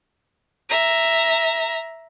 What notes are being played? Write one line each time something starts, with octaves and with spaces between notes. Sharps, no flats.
E5 A#5